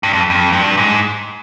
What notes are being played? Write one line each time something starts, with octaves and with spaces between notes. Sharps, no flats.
G2
F2
F2
G2
G#2